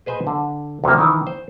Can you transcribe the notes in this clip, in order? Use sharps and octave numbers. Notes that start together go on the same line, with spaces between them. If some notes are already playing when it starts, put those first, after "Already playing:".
G#4 B4 C5 D#5 G#5
D3
D2 C3 E3 F3 A#3
D#3 E3
C5